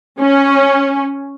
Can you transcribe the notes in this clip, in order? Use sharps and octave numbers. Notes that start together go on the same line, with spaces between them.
C#4